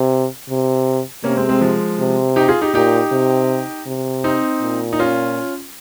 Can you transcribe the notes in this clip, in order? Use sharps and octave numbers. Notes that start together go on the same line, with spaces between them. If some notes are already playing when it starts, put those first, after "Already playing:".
Already playing: C3
C3
C3 A#3 C#4
G#3 C4
G#3 C4
F3 G#3
C3
D#4 G4
F4 G#4
D#4 G4
A#2 D#4 G4
C3
C3
C4 D#4
A#2
D#4
C#4 F4